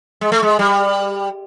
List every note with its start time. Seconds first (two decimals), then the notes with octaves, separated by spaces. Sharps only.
0.21 G#3
0.32 A3
0.43 G#3
0.59 G3